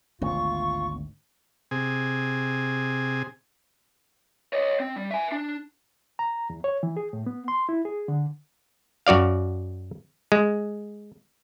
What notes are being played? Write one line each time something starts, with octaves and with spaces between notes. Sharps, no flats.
G#1 D2 B3 F4 C#6
C3 G#4
C#5 D#5
C4
G3
E5 G#5
D4
A#5
E2
C#5
E3
G#4
A2
B3
C6
E4
G#4
D3
F#2 F#4 D5 F5
G#3